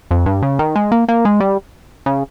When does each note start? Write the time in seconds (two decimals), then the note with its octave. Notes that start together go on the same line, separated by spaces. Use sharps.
0.11 F2
0.26 G2
0.43 C#3
0.59 D#3
0.76 G#3
0.92 A#3
1.08 A#3
1.25 G#3
1.40 G3
2.06 C#3